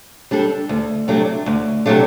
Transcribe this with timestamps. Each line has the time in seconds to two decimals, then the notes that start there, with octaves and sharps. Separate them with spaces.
0.31 G3 D4 A4
0.69 D2
1.08 C3 F#3 A3 D4
1.46 D2
1.86 C3 F#3 A3 D4